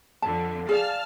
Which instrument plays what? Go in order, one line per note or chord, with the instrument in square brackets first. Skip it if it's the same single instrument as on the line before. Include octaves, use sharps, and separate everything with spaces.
[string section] F2 D3 [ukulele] A5
[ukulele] G#4 D5 F5 [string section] A5 F6